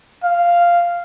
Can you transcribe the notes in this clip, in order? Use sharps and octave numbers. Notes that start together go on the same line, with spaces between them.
F5